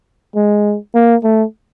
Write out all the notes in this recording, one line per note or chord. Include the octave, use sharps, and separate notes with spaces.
G#3
A#3
A3